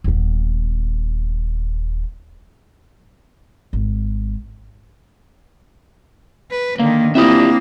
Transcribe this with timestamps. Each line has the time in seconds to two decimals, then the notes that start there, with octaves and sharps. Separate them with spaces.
0.04 D#1 B3
3.73 G#1
6.51 B4
6.79 D3 D#3 A#3 F5
7.15 A#3 C4 D4 E4 F4 G4 E5 D#6